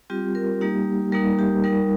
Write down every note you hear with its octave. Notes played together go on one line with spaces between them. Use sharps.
G3 C4 F4 G4
A#4
G3 A#3 D#4 G4
G3 A#3 D#4 A#4
G4
G3 D#4 A#4